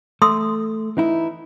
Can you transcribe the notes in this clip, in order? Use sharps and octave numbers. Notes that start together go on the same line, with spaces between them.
A3 C6 D#6 E6
E3 D#4 E4